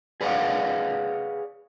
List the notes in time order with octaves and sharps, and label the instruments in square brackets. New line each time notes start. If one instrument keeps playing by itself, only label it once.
[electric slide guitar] G#4 B4 C#5 D5 F5 F#5